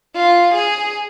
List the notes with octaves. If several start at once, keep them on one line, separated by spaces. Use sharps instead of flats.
F4
G#4